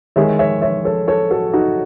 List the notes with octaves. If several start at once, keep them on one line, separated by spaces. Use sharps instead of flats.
D#3 G#3 C#5 E5
C#5 E5
C#5 E5
A4 C#5
A4 C#5
F#4 A4
D#4 F#4